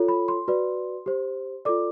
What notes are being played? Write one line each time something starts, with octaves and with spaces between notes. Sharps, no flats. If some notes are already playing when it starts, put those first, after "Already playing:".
Already playing: F4 A4 C#5
B5
C6
F#4 B4 D5
G4 C5
F4 A4 D5 D6